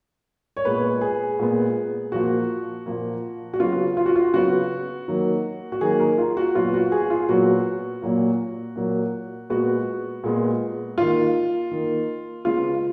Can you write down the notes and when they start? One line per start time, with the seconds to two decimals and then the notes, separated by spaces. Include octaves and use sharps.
0.57 C#5
0.65 A#2 G#3 B3 B4
1.01 G#4
1.39 A#2 G#3 B3
2.12 A#2 F3 A#3 F#4
2.86 A#2 F3 A#3
3.54 F#4
3.60 C#3 F#3 B3 F4
3.97 F4
4.06 F#4
4.16 F4
4.34 C#3 F#3 B3 F#4
5.08 D#3 F#3 A#3
5.72 F#4
5.81 D#3 F#3 A#3 G#4
6.00 A#4
6.18 F4
6.37 F#4
6.55 A#2 F#3 B3 F4
6.74 F#4
6.92 G#4
7.10 F4
7.29 A#2 F#3 B3 F#4
8.02 A#2 F#3 A#3
8.76 A#2 F#3 A#3
9.50 A#2 G#3 B3 F#4
10.24 A#2 G#3 B3
10.98 D#3 A#3 F4
11.71 D#3 A#3
12.45 C#3 G#3 B3 F4